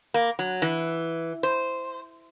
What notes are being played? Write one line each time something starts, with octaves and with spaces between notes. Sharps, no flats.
A#3
F#3
E3
C5